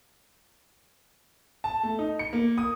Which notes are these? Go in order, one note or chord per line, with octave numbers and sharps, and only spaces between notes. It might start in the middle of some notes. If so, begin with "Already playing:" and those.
A5
A3
D#4
C#7
A#3
D#6